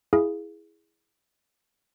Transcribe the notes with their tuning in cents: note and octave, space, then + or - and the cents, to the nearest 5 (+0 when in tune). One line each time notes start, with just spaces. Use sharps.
E4 +0 G#4 +0 F5 +0